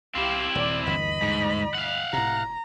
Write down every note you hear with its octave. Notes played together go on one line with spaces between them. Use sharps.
C2 C4 E4 G4 F5
D#1 D#2 D5
G1 D2 E3 D#5 B5
G#2
F5 F#5
F1 A2 C3 A#5